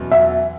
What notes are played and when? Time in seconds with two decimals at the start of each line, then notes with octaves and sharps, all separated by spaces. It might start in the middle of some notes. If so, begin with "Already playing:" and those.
Already playing: E2 B2 F#3 C#4 E4
0.11 E5